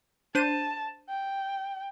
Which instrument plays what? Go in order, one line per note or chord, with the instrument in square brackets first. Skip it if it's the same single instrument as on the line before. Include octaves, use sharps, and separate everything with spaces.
[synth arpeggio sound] D4 C5 D#7 [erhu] A5
[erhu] G5